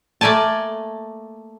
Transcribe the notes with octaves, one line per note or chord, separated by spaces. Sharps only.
A3 A#3 D5 G#5 A5